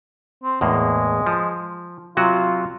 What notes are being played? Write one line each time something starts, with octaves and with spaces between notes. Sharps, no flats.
C4
E2 A2 G#3 A#3
F3
C3 F#3 F4 F#4